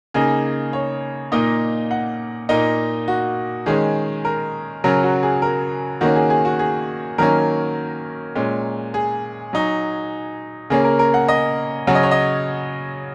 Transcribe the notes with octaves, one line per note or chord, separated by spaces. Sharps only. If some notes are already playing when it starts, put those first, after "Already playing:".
C#3 A#3 D#4 G#4
C#5
A#2 A#3 D#4 D#5
F#5
A#2 A#3 D#4 D#5
F#4
D#3 G#3 C#4 G#4
A#4
C#3 F#3 C#4 A#4
F#4
G#4
A#4
D#3 A#3 C#4 F#4
G#4
G#4
F#4
G#4
D#3 F#3 A#3 C#4 A#4
A#2 G#3 C#4
G#4
F#3 D#4
C#3 A#3 C#4 G#4
A#4
A#4
F#5
D#5
C#3 F#3 C#4 F#5
D#5
C#5
D#5